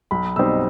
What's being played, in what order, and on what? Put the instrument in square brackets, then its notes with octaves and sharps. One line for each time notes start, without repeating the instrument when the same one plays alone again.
[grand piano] B1 B5
B2 G3 C4 D#4 E6